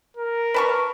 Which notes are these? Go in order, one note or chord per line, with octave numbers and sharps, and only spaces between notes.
A#4
B4 A5 C#6